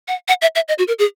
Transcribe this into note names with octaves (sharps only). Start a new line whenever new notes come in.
F#5
F#5
E5
E5
D#5
F#4
A#4
G#4